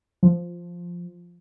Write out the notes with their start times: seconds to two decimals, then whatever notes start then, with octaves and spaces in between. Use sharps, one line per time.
0.23 F3